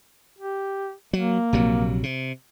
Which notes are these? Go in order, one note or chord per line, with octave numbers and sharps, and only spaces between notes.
G4
F#3 A#3
A#1 C3 F#3
C3